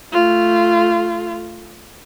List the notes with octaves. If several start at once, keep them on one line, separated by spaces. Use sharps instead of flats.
A3 F4